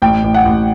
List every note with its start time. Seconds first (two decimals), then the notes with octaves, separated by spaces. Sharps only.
0.02 A1 G5
0.24 A1
0.34 F#5
0.45 A1